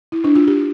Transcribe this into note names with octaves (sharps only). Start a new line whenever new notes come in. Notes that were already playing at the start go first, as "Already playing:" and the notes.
E4
D4
F4
G4